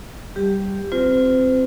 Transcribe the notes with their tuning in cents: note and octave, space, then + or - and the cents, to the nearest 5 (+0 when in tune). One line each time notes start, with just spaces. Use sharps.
G3 -10 G4 +10
C4 +0 F4 +0 C5 -35